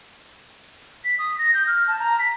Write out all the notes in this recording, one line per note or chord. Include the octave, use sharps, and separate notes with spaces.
B6
D#6
A#6
G6
F6
A5
A#5
B6